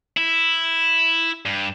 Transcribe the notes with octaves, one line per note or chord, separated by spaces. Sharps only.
E4
G2